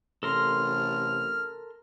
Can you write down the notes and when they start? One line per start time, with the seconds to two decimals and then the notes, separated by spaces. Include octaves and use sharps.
0.23 A1 C3 A4 A#4 C6 F6